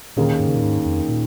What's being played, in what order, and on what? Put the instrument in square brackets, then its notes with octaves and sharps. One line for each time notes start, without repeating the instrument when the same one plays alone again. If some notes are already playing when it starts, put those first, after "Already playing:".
[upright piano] D#2 D#3 A#3 C#4 G#4 [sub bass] A#2
[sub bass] G#2
C#3
A#2
G#2
F2
A#2